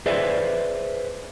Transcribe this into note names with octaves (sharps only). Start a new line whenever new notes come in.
G#4 B4 C5 D5 E5